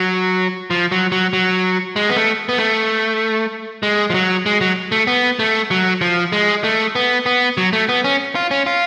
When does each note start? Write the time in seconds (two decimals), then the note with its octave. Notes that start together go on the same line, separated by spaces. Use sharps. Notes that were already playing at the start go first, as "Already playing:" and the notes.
Already playing: F#3
0.70 F3
0.92 F#3
1.12 F#3
1.33 F#3
1.96 G#3
2.09 B3
2.16 A3
2.49 B3
2.58 A3
3.83 G#3
4.10 F3
4.14 F#3
4.46 G#3
4.61 F#3
4.92 A3
5.07 B3
5.39 A3
5.71 F#3
6.01 F3
6.32 G#3
6.64 A3
6.95 B3
7.26 B3
7.57 F#3
7.73 A3
7.89 B3
8.04 C#4
8.35 F4
8.51 C#4
8.66 F4